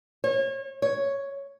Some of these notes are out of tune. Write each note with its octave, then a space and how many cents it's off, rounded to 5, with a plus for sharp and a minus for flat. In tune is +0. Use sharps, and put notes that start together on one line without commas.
C#5 -35
C#5 +0